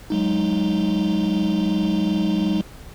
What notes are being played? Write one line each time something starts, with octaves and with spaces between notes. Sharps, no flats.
F#3 G#3 D#4